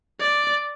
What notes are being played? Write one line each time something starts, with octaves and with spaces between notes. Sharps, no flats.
D5